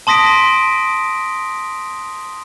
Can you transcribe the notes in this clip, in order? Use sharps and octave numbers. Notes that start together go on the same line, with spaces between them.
A5 C6 D#6 A#6 B6 D7